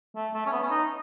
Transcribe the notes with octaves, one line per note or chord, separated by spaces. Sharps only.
A3
A3
C#4
B3
C#4
D#4